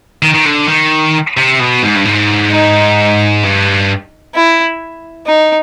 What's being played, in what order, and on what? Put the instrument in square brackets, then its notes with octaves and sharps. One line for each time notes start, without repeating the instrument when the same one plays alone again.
[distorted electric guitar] D#3
D#3
D3
D#3
C3
B2
G#2
G2
G#2
[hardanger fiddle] D#4
[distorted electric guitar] G2
[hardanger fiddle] E4
D#4